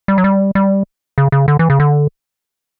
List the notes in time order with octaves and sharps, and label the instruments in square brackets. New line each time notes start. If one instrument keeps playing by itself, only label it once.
[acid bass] G3
F#3
G3
G3
C#3
C#3
D3
E3
C#3
D3